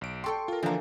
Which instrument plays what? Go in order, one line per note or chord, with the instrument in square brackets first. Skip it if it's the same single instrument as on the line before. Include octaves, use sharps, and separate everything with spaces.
[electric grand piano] B1 D7
[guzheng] G4 A4 G5 [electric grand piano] C6 C#6
[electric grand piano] F4 A#4
[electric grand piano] D3 F3 D4 [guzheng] E3 A#3